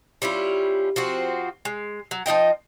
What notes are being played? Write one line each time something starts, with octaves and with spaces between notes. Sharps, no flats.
G3 C#4 E4 F4
F3 C4 F#4
G#3
F#3
F3 D#4 D#5 G5